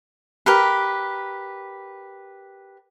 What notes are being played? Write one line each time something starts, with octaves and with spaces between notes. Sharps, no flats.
G4 A#4 B4